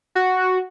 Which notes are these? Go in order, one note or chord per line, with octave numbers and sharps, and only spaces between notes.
F#4